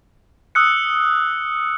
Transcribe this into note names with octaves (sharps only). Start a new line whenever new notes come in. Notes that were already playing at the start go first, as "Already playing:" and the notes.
D#6 E6 F#6 C#7